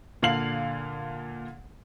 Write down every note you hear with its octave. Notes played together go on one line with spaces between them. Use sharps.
A#2 D3 F5 F6 C7 F#7